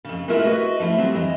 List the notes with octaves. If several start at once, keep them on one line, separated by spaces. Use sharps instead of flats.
F2 C#3
G#3 A3 B3 E4 F4 A#4
E4 F#4 G#4 A#4 B4 D#5
F3 A3 E4 F4
F#3 G3 C4
F2 E3 D#5